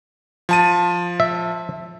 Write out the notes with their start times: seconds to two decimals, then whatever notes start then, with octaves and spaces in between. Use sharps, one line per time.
0.49 F3 A5 D#7
1.20 E5